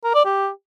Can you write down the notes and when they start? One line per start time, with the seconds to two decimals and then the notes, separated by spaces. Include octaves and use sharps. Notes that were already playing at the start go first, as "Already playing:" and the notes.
0.04 A#4
0.15 D5
0.25 G4